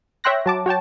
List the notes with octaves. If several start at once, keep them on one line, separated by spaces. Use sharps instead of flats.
C#5 E5 G5 C6 F#6 A#6
F#3 A5 D6
F#4 C#5 G5 A5